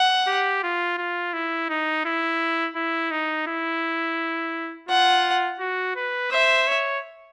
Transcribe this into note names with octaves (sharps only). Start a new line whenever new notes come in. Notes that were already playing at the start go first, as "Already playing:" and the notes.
Already playing: F#5
G4
F4
F4
E4
D#4
E4
E4
D#4
E4
F4 F#5
F#4
B4
C5 E5
C#5